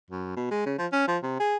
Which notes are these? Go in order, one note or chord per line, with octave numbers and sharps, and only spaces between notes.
F#2
B2
G#3
C#3
F3
C#4
F3
C3
G#4